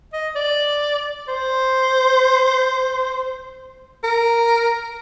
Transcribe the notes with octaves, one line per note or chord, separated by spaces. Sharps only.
D#5
D5
C5
A#4